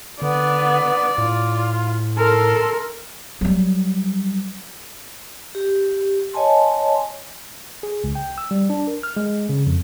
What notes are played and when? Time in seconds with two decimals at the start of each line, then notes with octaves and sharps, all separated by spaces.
0.22 D3 B3 D5
1.18 A2 F4
2.17 A4 A#4 C6
3.41 F#3 G3
5.55 G4
6.34 C#5 D#5 G#5 A5 C6
7.83 G#4
8.04 C#2
8.15 G5
8.38 E6
8.51 G3
8.70 D4
8.87 A#4
9.03 F6
9.17 G#3
9.49 C#3
9.66 F2